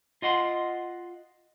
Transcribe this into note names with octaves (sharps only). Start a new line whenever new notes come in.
F4 D#5 F#5 C6